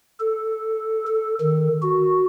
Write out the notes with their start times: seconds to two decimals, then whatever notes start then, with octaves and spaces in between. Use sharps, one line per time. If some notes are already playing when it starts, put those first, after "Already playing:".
0.20 A4
1.07 A4
1.40 D#3
1.82 F#4